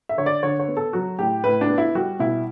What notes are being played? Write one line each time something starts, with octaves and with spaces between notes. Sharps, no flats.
E5
D3 C#5
D5
D3 C#5
C#5
B3
A4
F#3 F#4
A2 G4
A2 B4
D4
B3
E4
G3 F#4
B2 E4